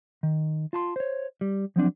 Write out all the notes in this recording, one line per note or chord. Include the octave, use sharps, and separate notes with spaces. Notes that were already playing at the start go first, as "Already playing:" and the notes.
D#3
F4 A5 C6
C5 C#5
G3
F3 F#3 C4 D4